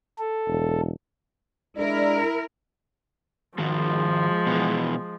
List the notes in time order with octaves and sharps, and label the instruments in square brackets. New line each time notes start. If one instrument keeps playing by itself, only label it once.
[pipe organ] A4
[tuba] E1
[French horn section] G#3 D4 D5 [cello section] E4 A#4
[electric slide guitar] G#2 D#3 F#4 [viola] F3 G#3
[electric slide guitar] B2 E3